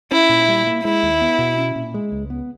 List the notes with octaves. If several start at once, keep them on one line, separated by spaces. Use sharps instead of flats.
C#4 E4
A#2
G3
A#3
G#3 E4
D#2
B3
B2
C#4
A#2
G#3
C#2
B3